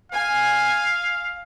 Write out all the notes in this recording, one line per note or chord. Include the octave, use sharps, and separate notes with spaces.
F5 G#5